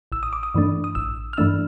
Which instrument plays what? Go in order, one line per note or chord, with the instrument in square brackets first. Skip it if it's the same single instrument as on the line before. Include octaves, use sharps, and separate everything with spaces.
[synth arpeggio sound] A1 E6
D#6
D6
D#6
G2 E3 A3 D4
D#6
A1 E6
F6
G2 E3 A3 D4 E6